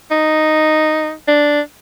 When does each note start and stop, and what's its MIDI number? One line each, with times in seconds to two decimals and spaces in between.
0.11 1.12 63
1.28 1.61 62